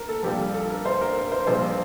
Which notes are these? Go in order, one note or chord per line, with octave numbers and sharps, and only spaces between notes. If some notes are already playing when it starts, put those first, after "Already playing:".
Already playing: A#4
A4
A#1 A#2 G3 G4
A4
A#4
C5
A#4
A#4
C5
A#1 A#2 G3 C5